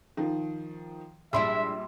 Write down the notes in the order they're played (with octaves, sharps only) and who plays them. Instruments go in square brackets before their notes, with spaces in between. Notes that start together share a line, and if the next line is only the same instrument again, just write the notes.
[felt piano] D#3 F3
[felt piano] A#1 G3 [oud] G#3 D4 E4 [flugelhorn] E5 [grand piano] C6 E6